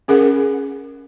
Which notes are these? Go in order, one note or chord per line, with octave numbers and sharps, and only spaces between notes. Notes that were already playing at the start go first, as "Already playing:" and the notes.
C#4 G#4 A#4 F#5